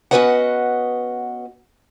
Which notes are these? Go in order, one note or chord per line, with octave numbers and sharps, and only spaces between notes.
B3 C#4 F#4 B4 D#5 F#5